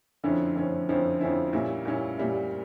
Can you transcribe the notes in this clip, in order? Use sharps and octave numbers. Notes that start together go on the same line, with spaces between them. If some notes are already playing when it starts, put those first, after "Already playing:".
F2 D3 F3 C#4 E4
F2 D3 F3 C#4 E4
F2 D3 F3 C#4 E4
F2 D3 F3 C#4 E4
A#2 G3 C#4 E4
A#2 G3 C#4 E4
A#2 G3 C#4 E4